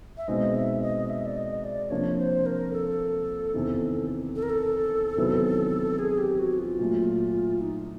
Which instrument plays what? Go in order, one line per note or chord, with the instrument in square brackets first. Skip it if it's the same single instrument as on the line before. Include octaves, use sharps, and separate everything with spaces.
[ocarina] E5
[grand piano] B2 G#3 C4 D#4 [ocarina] D#5
[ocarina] E5
D#5
E5
D5
D#5
D5
[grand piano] C3 F3 A#3 D4 [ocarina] C#5
[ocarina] C5
A#4
A4
[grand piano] E2 C3 D#3
[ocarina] A4
A#4
A4
[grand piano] E2 C3 D#3 F#3 B3
[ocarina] G#4
G4
F#4
F4
[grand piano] A#2 F#3 A3
[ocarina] D#4